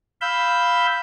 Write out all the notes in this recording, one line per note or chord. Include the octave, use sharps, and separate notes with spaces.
F5 B5 E6 G6